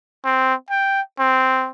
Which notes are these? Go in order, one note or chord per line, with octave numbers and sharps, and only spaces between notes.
C4
G5
C4